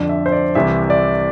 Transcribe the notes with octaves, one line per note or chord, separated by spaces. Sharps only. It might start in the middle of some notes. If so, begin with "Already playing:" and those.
Already playing: F2 D3 D5
E5
C5
D5
C2 C3 E3 E5
D5